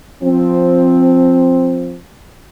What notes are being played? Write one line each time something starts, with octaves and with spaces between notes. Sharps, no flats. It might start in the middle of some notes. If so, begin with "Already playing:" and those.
F3 C4